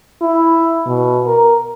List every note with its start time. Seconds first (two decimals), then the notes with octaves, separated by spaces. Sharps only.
0.22 E4
0.86 B2
1.27 A#4